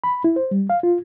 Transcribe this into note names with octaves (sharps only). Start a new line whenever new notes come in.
B5
E4
C5
G3
F5
F4